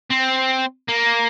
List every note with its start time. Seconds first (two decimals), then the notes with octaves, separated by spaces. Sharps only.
0.10 C4
0.88 A#3